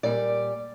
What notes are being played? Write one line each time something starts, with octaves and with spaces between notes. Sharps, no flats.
A#2 G3 D5